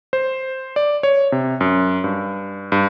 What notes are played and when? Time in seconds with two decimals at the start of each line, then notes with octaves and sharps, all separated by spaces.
0.13 C5
0.76 D5
1.03 C#5
1.32 C3
1.61 F#2
2.04 G2
2.72 G2